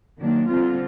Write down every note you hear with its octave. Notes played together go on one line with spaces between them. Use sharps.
D#3 F#3 A#3 D4
D3 G3 C4 F4